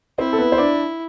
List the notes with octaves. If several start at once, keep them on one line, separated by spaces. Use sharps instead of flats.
C4 E4 C5
A4
B3 B4
C5
D4 D5